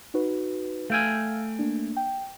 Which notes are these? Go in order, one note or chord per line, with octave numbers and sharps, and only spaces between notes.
D#4 F#4 B4
A3 F5 G5 G#5 E6 F6
A#3 D4
G5